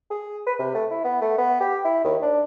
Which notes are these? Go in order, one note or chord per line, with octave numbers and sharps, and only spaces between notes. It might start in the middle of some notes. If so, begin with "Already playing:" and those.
G#4
B4
C3
A3
E4
B3
A3
B3
G4
E4
D#2
D4